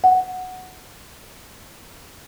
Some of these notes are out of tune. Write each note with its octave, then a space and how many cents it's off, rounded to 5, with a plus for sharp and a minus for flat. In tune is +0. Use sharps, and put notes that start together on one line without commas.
F#5 -5